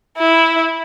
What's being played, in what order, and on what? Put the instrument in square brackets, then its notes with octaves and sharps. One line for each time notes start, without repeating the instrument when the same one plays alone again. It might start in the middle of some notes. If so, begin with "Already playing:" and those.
[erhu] E4